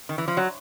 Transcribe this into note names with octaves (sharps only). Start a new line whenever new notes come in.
D#3
E3
F3
F#3